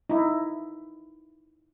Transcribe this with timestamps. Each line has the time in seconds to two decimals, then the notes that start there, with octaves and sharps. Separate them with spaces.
0.10 D#4 E4